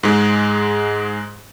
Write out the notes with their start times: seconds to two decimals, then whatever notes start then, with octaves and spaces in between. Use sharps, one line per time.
0.03 G#2 G#3